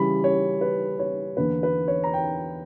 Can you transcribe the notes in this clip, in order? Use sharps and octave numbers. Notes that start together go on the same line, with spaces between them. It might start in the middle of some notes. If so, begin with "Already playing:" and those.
Already playing: C#3 E3 G3 B5
C#5
B4
C#5
E2 D3 A#3 B4
B4
C#5
A#5
G5